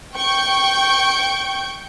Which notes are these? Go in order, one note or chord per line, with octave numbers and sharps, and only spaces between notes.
G5 C#6 G6 D7